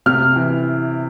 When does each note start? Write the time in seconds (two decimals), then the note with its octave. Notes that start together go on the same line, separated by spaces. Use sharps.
0.06 C3 F6
0.36 E3